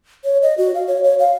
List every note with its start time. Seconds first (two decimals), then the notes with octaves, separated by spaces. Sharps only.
0.24 C#5
0.42 D#5
0.58 F#4
0.75 F5
0.87 C#5
1.03 C#5
1.19 F5